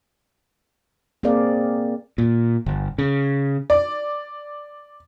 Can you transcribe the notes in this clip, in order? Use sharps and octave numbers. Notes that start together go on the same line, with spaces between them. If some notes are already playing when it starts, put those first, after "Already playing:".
A#3 C4 G#4 A#4 D5 F5
A#2
G1
C#3
D5